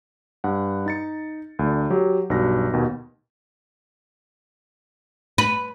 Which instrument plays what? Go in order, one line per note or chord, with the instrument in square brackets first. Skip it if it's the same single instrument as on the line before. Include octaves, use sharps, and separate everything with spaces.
[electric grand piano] G2 F#5
D#4 A6 C#7
D2 D4
F#3 G4
B1 G2 F#4 A#6
D#2 B2
[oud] B4